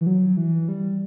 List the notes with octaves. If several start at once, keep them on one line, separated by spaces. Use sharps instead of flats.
E3
F#3
E3
G3